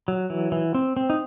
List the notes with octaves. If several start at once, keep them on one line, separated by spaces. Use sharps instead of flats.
F#3
E3
E3
C4
C4
D#4